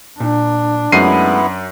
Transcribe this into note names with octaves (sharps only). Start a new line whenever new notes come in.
A#2 D4
F#2 G#3 A3 B3 D#4 E4 C7 D#7